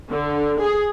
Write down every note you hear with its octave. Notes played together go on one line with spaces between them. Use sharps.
D3
G#4